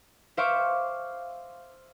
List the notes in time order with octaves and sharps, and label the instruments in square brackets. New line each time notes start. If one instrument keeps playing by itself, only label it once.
[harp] C5 E5 F5 C#6 D6